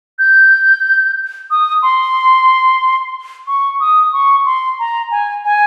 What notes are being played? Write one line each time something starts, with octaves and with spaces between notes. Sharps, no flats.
G6
D#6
C6
C#6
D#6
C#6
C6
A#5
G#5
G#5